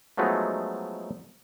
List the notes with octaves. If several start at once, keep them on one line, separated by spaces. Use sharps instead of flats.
F3 F#3 G#3 A3 B3 D#4